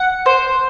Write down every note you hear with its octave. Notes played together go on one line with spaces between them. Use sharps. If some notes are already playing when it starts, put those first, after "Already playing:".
Already playing: F#5
C5